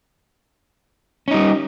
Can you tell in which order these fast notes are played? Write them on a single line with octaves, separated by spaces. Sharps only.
C#4 D#4 G3